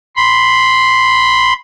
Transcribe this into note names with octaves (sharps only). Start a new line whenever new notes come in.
B5 C6